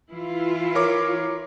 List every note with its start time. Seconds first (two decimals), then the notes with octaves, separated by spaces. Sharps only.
0.12 E3 E4 F4
0.75 A#4 C#5 D6